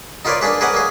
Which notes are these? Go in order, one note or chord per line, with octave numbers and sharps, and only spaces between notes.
D#4 F4 A#4 B4 C#5 D5
A#3 D4 G#4 B4
G#4 A#4 B4 C#5 D#5 F#5
A#3 G#4